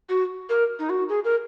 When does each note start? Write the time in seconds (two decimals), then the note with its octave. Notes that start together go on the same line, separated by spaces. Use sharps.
0.09 F#4
0.49 A#4
0.79 D#4
0.90 F#4
1.09 G#4
1.25 A#4